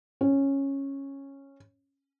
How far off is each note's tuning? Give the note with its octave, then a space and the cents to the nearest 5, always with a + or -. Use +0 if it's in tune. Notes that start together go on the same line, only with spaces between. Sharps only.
C#4 -10